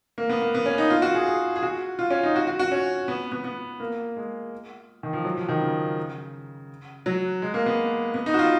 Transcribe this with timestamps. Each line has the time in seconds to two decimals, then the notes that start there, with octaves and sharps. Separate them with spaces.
0.18 A#3
0.29 B3
0.42 A#3
0.54 B3
0.66 C#4
0.78 D#4
0.90 F4
1.02 F#4
1.14 G#4
1.26 G#4
1.56 G#4
1.63 F#4
1.99 F4
2.10 C#4
2.23 D#4
2.36 F#4
2.47 F#4
2.59 F#4
2.72 C#4
3.08 B3
3.32 B3
3.44 B3
3.80 A#3
4.16 G#3
5.03 D#3
5.13 F3
5.25 F#3
5.37 F3
5.49 D#3
5.62 C#3
7.06 F#3
7.42 G#3
7.54 A#3
7.66 B3
8.14 B3
8.26 D#4
8.34 F#4
8.39 F4